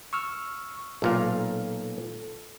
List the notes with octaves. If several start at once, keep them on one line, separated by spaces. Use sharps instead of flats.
C#6 E6 F6
B1 A#2 A4 F5